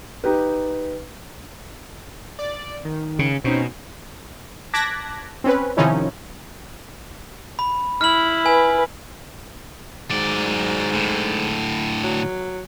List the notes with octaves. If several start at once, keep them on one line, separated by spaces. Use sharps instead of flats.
D#4 G4 B4
D5
D#3
C#3
B2 C4 C#4 D#4
A5 D6 F#6 G#6 A#6 B6
C4 C#4 B4
C3 D#3 F3 C#4 D#4 E4
B5
E4 F6 F#7
B4 G#5
G#2 F#3 D5
A2 D3
F#3